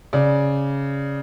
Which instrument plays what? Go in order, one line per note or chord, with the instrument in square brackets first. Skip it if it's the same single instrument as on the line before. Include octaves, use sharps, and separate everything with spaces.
[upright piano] C#3 D5